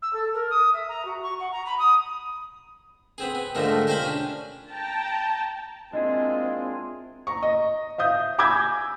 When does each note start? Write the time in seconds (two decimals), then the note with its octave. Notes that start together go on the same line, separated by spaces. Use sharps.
0.02 E6
0.13 A4
0.34 A#4
0.50 D#6
0.73 E5
0.88 A#5
1.05 F#4
1.23 C#6
1.39 F#5
1.52 A#5
1.66 B5
1.78 D#6
3.18 B3 C4 G#4
3.35 B3
3.55 G#2 D3 D#3 F3 A3 A#3
3.87 G4 A#4 C5 F5 G5 B5
4.02 C#4 D4
4.70 G5 A5 A#5
5.93 G#3 A#3 C4 D4 E4 F4 G#4 D#5
7.27 A#5 C#6
7.43 D#5
7.98 E5 F5 D#6 G6
8.38 G#5 B5 D6 E6 G6 G#6